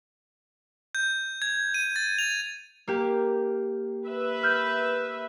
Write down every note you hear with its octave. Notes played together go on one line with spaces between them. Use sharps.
G6
G#6
D#7
A6
F7
A#3 G4
B4 E5
F6 G6